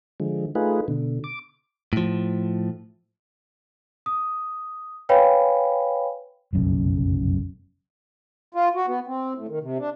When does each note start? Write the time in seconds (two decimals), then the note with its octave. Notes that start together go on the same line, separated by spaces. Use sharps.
0.20 D3 F3 G#3
0.55 A3 D#4 F4 G#4 B4
0.88 B2 D3
1.24 D6
1.93 A2 F3
4.06 D#6
5.09 B4 C#5 F5 G5 G#5 B5
6.53 F1 B1 F#2 C#3
8.54 F4
8.75 F#4
8.87 B3
9.07 C4
9.35 A2
9.48 D#3
9.61 C3
9.78 D4